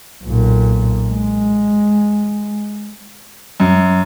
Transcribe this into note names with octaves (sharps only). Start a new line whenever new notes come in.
B1 A#2
G#3
F#2